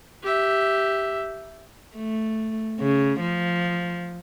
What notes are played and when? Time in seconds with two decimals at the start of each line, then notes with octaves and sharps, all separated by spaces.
0.23 G4 E5
1.96 A3
2.80 C#3
3.20 F3